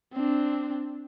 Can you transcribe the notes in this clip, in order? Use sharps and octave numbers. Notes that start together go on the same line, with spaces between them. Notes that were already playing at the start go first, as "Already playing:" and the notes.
C4 D4